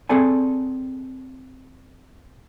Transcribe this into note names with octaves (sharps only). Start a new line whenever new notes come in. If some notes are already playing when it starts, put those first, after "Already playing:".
C4 G#4 A4 D5 G#5